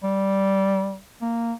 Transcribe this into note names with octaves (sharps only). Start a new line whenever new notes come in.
G3
A#3